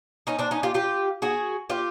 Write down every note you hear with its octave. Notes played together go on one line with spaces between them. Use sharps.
C#4 D#4
C4 D4
C#4 D#4
F4 G4
F4 G4
F#4 G#4
F4 G4